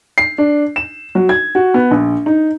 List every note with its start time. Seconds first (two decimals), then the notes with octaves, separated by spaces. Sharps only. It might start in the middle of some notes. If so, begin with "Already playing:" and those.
0.18 C7
0.38 D4
0.76 E7
1.15 F#3
1.29 G#6
1.55 F#4
1.74 B3
1.91 A#1
2.26 D#4